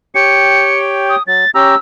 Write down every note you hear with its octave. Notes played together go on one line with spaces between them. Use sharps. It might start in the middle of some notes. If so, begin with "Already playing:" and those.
G4 C#5 G5 C#7
D#6
F#3 A6
C#4 G4 A#5 E6